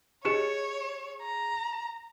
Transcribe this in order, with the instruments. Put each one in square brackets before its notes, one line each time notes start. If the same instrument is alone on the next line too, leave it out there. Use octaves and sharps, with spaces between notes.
[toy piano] G4 D#5 [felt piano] G#4 C#7 E7 [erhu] C#5
[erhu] A#5